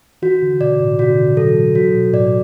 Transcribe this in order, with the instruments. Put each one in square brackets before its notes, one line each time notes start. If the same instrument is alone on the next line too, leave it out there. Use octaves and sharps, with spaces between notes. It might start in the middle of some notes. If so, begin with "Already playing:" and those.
[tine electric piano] E3 [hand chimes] F#4
[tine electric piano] D3
[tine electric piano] B2 [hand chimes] D5
[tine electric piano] A2
[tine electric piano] B2 [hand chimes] F#4
[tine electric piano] D3
E3
[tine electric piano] F#3 [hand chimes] A4
[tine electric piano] F#3 [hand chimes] F#4
[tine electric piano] B2
[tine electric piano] A2 [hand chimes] D5